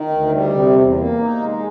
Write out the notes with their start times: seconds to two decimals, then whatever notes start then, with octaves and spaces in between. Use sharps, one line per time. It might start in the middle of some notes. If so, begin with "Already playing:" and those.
Already playing: D#3
0.09 D2
0.32 G3
0.53 C3
0.75 E2
0.96 A#3
1.18 D#4
1.39 G#3